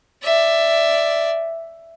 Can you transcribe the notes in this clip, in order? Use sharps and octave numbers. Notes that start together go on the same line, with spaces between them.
D5 E5